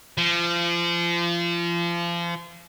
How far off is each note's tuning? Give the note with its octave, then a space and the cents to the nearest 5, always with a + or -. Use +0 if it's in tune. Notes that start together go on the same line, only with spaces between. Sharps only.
F3 -30